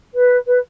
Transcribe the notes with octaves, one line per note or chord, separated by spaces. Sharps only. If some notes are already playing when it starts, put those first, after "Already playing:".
B4
B4